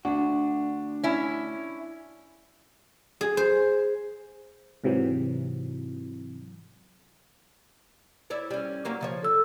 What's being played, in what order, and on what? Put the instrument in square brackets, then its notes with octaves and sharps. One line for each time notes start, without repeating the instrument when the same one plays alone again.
[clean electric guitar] D2 F#4 [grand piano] D4
[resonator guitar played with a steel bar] C#4 E4
[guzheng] G#4
C5
[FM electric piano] G#2 C3 E3 F#3
[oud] E4 C#5 D5
G3 C#4
F#3 A#3 C#4
C#3 F3 C#5
[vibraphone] A4 E6